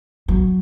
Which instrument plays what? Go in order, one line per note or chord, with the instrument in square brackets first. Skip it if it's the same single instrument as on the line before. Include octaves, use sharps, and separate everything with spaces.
[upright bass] F#3